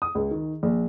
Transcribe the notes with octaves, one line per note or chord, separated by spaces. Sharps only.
D#6
C#2
D#3
A#1